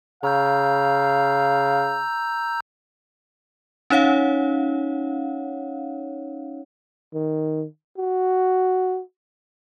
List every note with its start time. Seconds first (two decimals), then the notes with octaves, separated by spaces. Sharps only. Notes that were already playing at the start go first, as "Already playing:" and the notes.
0.23 C#3 F5 A#5 E6 G6
3.90 C#4 D#4 C#5 F5 F#5
7.13 D#3
7.97 F#4